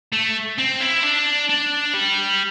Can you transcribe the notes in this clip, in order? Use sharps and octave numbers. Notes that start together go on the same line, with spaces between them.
A3
C4
E4
D4
D4
G3